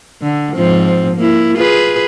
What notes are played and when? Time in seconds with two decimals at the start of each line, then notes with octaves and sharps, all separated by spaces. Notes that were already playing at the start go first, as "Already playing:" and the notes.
0.22 D3
0.54 G#2 F3 C4
1.16 A#3 E4
1.57 F4 G#4 B4